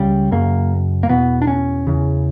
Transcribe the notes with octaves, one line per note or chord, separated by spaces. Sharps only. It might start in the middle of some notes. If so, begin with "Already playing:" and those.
Already playing: C#2 C#3 G3
F#2 C#3 A#3
A#3
E2 B2 B3
D4
C#4
E2 C#3